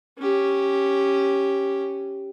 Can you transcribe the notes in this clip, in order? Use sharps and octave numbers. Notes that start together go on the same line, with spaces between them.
C#4 G4